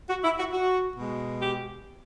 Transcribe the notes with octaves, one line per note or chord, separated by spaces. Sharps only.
F#4
E4
F#4
F#4
B2 G#3
G4